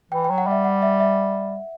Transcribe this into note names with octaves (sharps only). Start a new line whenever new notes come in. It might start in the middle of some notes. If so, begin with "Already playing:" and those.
E3 G5
G5
F#3
F#5
G3 E5
F#5
E5
E5